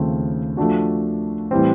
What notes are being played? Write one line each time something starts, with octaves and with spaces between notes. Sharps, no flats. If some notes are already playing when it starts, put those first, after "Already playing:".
Already playing: D#2 C#3 F3 A3 C4
F3 A3 D4 F#4
A2 E3 G3 C4